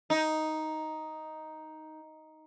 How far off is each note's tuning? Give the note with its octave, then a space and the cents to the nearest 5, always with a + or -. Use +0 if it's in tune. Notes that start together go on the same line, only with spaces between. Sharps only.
D#4 +5